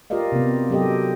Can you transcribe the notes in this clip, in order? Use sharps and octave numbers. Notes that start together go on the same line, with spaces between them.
F4 G4 A#4 D5 D#5 F5
C3 B3
F#3 D4 G4 A4 D#5